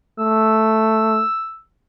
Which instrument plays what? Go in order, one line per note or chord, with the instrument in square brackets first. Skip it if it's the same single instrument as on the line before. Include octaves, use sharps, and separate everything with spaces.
[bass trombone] A3 [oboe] E6